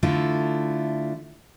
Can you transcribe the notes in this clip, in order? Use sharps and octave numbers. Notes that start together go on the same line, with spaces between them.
D3 A3 E4 F4